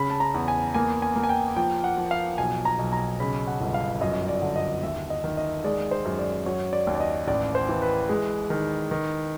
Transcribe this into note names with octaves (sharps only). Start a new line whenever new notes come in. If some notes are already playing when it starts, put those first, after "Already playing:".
Already playing: C#3 B5
A5
A#5
E2
G#5
A#3 G#5
G#5
A#3
G#5
G5
F3 G5
F#5
F3
F5
B1 G#5
A#5
B1
A#5
C#3 B5
F#5
G1
F5
F#2 D#5
D5
D3
D#5
D#2 E5
D#5
D#3
D#5
G#3 D5
C5
F#2
D5
F#3 C#5
D5
D#2
D5
D#5
A1 D5
C5
E3
B4
G#3
D#3
D#3